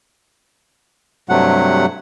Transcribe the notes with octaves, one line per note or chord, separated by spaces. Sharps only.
G2 C3 F#3 A3 F#5